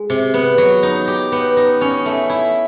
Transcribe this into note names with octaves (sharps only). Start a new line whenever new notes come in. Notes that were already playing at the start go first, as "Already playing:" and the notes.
Already playing: G#3
C3
B3
F#3
D#4
G4
B3
D#4
C#4
A3
E4